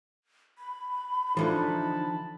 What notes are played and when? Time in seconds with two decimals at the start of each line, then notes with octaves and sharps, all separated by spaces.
0.58 B5
1.37 D3 E3 F3 D#4 A5 B5